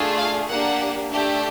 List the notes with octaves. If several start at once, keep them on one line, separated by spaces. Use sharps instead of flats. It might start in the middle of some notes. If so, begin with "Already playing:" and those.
Already playing: A3 D4 F4 G#4
F5
A#3 D4 G4 F#5
A3 D4 G4